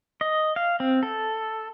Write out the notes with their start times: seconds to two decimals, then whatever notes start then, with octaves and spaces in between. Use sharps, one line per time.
0.21 D#5
0.56 F5
0.80 C4
1.03 A4